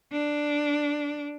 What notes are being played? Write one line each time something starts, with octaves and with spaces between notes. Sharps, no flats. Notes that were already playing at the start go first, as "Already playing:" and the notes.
D4